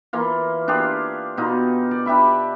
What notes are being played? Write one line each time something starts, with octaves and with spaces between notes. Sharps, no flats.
E3 A#3 F4
D4 F4 G4 G#4
B2 D#4 F4
D5
D4 G4 E5 B5